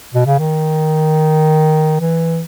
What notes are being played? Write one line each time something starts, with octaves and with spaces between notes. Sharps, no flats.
B2
C#3
D#3
E3